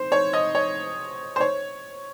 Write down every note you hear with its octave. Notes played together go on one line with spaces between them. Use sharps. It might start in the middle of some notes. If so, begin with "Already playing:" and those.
Already playing: C5
C#5
D#5
C#5
C5
C#5